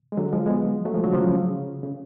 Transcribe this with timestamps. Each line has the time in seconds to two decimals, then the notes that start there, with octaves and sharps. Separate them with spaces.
0.12 G#3
0.17 D3 F#3
0.32 F3 G#3
0.46 G#3 B3
0.85 F#3 A3
0.94 F3 G#3
1.04 D3 F#3
1.13 C#3 F3
1.24 C#3
1.83 C#3